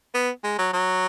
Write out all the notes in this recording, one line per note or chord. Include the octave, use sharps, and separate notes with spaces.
B3
G#3
F#3
F#3